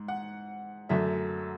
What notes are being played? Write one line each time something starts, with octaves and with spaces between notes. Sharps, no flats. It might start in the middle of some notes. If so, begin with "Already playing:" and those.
Already playing: G#2
F#5
F#2 D3 F#3 A3 E5